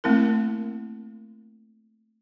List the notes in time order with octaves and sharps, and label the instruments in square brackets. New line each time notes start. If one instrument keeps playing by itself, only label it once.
[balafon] A3 A#3 C4 E4 A#4